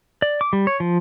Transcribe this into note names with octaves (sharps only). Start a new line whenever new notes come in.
D5
D6
G3
C#5
F3